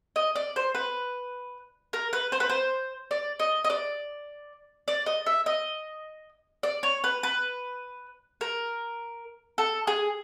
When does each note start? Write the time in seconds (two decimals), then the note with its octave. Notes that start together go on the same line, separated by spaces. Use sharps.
0.16 D#5
0.36 D5
0.56 C5
0.75 B4
1.93 A#4
2.13 B4
2.32 C5
2.40 B4
2.49 C5
3.11 D5
3.39 D#5
3.64 D#5
3.70 D5
4.88 D5
5.06 D#5
5.26 E5
5.46 D#5
6.63 D5
6.83 C#5
7.04 B4
7.23 B4
8.41 A#4
9.58 A4
9.87 G#4